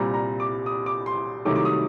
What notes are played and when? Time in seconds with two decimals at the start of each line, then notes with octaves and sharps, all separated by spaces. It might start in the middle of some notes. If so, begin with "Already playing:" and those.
Already playing: C2 A#2 G3 C4 A#5
0.14 A#5
0.40 D6
0.66 D#6
0.86 D6
1.06 C6
1.45 C2 C3 D#3 F#3 A3 D6
1.55 D6
1.65 D#6